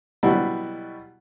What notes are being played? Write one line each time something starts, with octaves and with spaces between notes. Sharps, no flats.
B2 F#3 G3 E4 F#4